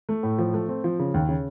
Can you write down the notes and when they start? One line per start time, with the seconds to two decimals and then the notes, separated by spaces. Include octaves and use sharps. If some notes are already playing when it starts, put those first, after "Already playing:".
0.09 A3
0.23 A2
0.38 F3
0.54 A3
0.69 C4
0.84 F3
0.99 C#3
1.14 D#2
1.29 C#3